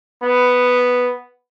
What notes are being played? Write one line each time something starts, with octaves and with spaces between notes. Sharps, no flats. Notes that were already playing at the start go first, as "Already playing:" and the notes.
B3